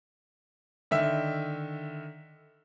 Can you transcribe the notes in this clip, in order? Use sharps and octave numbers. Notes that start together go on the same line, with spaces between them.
D3 D#3 E5